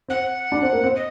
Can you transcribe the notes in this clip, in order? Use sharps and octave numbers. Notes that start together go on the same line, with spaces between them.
C4 F#5
D4
C4
A#3
C4
D#5